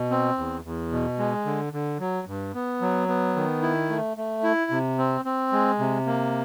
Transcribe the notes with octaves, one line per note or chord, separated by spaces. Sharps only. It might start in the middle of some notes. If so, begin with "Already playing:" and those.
Already playing: B2
C4
E2
E2
B2
G#3
D3
D3
F#3
G2
B3
F#3
B3
D#3
E4
A3
A3
E4
C3
C4
C4
G#3
C3
A#3